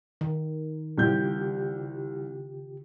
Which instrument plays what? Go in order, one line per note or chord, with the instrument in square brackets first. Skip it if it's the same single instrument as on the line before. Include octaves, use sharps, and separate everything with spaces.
[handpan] D#3
[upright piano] C2 G6 [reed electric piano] C#3 F4 G4